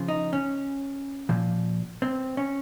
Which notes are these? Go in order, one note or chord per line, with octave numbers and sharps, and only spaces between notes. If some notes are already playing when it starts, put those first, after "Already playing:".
Already playing: C#3 F3
D#4
C#4
A#2 F3
C4
C#4